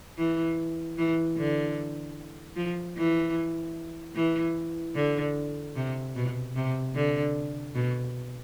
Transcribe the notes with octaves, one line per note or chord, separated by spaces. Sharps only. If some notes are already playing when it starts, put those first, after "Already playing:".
E3
E3
D3
F3
E3
E3
D3
C3
B2
C3
D3
B2